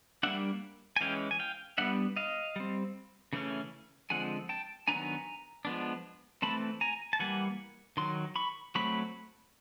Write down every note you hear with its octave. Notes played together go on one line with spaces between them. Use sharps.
G3 A#3 D4 E5 F#5
G#5
E3 G#3 C#4 F5 G5
G#5
F5 G5
G3 B3 D4 E5 F#5
D#5 F5
G3 C4
C#3 E3 A3 C#4
D3 F3 G#3 C4 F#5 G#5
G5 A5
D#3 F#3 B3 D4 G#5 A#5
F3 G#3 B3 D4
E3 A3 C4 A5 B5
G#5 A#5
A5
E3 G3 A#3 F#5 G#5
D#3 F#3 C6
B5 C#6
F#3 A3 C4 B5 C#6